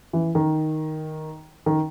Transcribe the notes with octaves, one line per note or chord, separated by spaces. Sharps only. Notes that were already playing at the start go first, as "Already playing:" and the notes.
E3
D#3
D#3